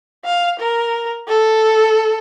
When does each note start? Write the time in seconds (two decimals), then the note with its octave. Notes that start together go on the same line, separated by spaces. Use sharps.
0.25 F5
0.59 A#4
1.28 A4